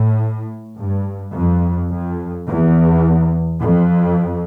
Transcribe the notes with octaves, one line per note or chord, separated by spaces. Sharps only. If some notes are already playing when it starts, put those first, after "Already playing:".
Already playing: A2
G2
F2
F2
E2
F2